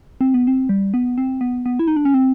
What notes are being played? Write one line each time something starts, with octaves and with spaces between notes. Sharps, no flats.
C4
B3
C4
G3
B3
C4
B3
B3
E4
D#4
D4
C#4
C4